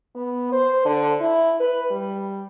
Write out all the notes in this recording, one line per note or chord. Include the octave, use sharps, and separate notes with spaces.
B3
C5
D3
E4
B4
G3